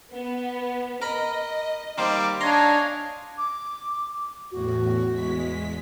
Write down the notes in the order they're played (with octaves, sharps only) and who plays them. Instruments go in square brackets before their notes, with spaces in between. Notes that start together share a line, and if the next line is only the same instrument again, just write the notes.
[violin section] B3
[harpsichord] A#4 B5 [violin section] D#5
[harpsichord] D#3 A#3 C5 [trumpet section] G3 D6
[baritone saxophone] D4 [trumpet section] C#5 D#5 G#5 [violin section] F5 [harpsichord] A#5 C6
[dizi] D6
[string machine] E2 A2 [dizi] F#4
[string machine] E2 G#3 B6